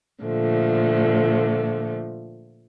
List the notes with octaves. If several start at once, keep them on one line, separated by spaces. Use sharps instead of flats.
A#2 D3 F3 A3